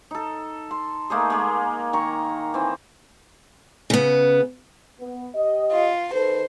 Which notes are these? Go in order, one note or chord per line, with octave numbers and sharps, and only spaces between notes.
D#4 A4
C6
A3 A#3 D#4 G#4
G#3 A#3
D#3 A#5 C#6
E3 C4
C#3 B3
B3
G4 D#5
F4
D#3 A4 B4 C5